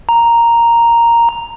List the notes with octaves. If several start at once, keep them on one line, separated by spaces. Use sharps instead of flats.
A#5